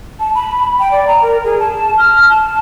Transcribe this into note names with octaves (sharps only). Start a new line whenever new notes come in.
A5
B5
G5
D5
A#5
A#4
G#4
A5
F6
A5